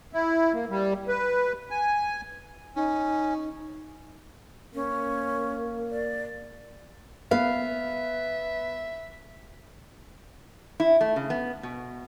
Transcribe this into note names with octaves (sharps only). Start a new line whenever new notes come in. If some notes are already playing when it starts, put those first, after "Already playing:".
E4
A#3
G3
B4
G#5
C#4 D#4
A#3 C#4
D5
B3 E5 F5
E4
A3
C#3
B3
B2